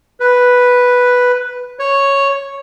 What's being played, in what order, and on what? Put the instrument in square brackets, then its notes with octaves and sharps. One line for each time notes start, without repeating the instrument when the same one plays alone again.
[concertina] B4
C#5